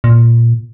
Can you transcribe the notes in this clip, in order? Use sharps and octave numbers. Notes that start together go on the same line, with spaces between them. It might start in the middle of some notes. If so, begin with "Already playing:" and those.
A#2